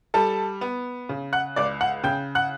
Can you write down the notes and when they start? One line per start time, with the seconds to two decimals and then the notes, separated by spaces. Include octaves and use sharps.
0.14 G3 A4 A5
0.61 B3
1.09 C#3
1.33 F#5 F#6
1.56 C#2 D5 D6
1.81 F#5 F#6
2.04 C#3 G5 G6
2.35 F#5 F#6